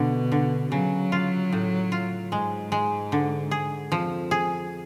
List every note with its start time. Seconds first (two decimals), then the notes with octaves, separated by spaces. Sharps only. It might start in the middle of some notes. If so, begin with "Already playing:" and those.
Already playing: B2 D3
0.32 D3
0.72 C#3 F#3
1.12 F4
1.53 A2
1.92 F4
2.32 G#2 G#3
2.72 G#3
3.12 D3
3.51 G#4
3.91 F2 F3
4.31 G#4